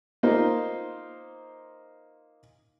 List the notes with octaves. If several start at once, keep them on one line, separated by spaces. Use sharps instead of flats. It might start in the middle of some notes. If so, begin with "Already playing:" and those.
A#3 D#4 F4 C5